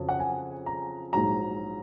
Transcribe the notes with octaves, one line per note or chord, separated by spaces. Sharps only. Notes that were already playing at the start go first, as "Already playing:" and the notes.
Already playing: F2 C#3 F#3 C#4
F#5
G#5
A#5
A#1 G#2 F#3 A#5